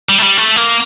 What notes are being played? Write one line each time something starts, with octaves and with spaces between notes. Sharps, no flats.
G3
A3
G3
A3
A#3